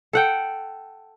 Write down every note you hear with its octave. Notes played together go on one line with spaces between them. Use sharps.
A4 F#5 G5